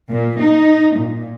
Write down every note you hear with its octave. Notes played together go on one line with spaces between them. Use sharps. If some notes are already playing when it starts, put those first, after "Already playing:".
A#2
D#4
A#2